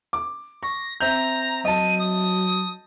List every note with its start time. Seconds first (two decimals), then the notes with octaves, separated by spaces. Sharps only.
0.13 D6
0.63 C#6 A#6
1.00 C4 E5 A#5 G6 F7
1.65 F#3 D#5 A5 D#7
1.99 D#6